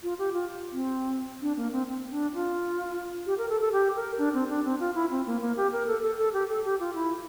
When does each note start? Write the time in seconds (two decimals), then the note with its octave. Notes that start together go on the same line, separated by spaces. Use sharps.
0.03 F4
0.19 G4
0.34 F4
0.72 C4
1.42 D4
1.57 A#3
1.72 C4
1.88 C4
2.11 D4
2.34 F4
3.26 G4
3.38 A#4
3.49 A4
3.61 A4
3.72 G4
3.95 A#4
4.18 D4
4.34 C4
4.49 D4
4.64 C4
4.80 F4
4.95 E4
5.11 C4
5.26 A#3
5.42 A#3
5.57 G4
5.72 A#4
5.87 A4
6.03 A4
6.18 A4
6.33 G4
6.49 A4
6.65 G4
6.80 F4
6.95 E4